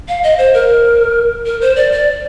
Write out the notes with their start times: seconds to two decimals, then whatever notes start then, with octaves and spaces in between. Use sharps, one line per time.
0.08 F5
0.23 D#5
0.38 C5
0.54 A#4
1.46 A#4
1.61 C5
1.76 D5
1.92 D5